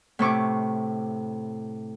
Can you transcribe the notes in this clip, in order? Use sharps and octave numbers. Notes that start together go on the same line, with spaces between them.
A2 C3 C#6 D6